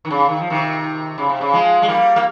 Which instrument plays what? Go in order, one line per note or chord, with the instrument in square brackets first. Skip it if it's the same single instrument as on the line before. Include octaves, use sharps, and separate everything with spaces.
[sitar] D#3
C#3
D#3
F3
C3 D#3
C#3
C3
C#3
F3 G#3
G#3
G3 A#3
A#3